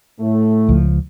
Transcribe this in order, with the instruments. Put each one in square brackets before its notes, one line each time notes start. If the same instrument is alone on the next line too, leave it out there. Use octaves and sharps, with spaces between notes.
[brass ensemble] A2 A3
[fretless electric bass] C#2 F3